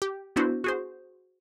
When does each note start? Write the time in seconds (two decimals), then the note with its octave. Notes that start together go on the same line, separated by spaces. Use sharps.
0.02 G4
0.36 B3 D4 E4 F#4 C5
0.64 F#4 G#4 C5